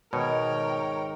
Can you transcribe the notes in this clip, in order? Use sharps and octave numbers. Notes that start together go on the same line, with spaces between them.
G#1 B2 A#4 C#5 G5